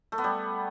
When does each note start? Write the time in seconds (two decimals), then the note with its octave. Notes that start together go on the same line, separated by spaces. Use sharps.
0.12 A3
0.18 B3
0.24 G3